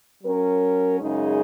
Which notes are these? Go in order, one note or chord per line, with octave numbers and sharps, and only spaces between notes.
F#3 C#4 A#4
F#2 C#3 G#3 D#4 G#4